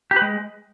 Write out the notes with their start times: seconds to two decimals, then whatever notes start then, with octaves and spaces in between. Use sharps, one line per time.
0.11 G4
0.16 B4
0.22 G#3